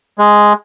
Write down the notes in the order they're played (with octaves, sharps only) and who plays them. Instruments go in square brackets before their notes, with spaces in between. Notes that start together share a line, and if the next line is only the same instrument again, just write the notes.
[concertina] G#3